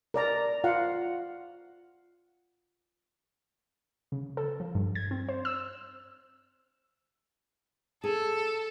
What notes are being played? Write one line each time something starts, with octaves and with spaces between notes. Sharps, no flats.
A#4 D5 A#5
F4 F5 F#5
C#3
A4
F3
G2
G#6
C4
C5
E6
G#4 A4